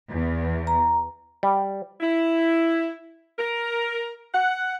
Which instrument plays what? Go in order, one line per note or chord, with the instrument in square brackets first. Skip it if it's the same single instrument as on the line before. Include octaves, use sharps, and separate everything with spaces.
[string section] E2
[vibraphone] A#5
[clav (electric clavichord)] G3
[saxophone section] E4
A#4
F#5